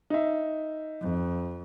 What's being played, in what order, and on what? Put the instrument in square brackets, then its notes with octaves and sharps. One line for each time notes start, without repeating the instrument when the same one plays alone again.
[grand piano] D#4 E5
[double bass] F2